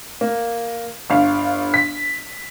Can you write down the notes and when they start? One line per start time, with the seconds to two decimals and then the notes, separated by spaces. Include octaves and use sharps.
0.21 A#3
1.10 G1 F5
1.74 B6